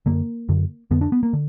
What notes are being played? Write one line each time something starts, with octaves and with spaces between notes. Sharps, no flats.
F#2 D3 A#3
F#2 D3
F2 D3 B3
D4
B3
A#3
D3